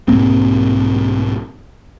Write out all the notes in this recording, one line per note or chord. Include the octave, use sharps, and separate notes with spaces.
B1 G#2 A#3 C4